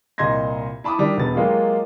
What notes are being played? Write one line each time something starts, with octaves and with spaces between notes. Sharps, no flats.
C2 A#2 D#5 C6 G#6 A#6
E4 A5 B5 D6 D#6
D#3 G3 D4
E1 B2 B4 A6
F#3 G#3 A#3 F4 G4